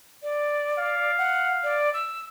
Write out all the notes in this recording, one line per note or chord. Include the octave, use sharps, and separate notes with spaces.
D5
F5
F#5
D5
E6